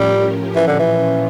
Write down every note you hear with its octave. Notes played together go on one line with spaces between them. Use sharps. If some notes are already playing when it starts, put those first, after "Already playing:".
Already playing: A2 F3 G3 C#4 G4 A#4
A#2 E3 F3 C#4
D3
E3